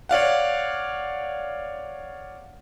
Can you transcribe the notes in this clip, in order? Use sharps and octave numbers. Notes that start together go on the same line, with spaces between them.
C#5 D5 F5 F#5